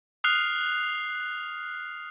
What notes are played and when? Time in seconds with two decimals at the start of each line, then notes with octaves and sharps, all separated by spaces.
0.24 D#6 F6 F#6 C7 F7